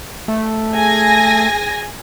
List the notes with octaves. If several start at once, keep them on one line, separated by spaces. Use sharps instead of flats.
A3
G#4 G#5 A#6